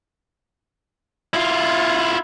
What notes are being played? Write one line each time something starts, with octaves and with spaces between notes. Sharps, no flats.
E4 F4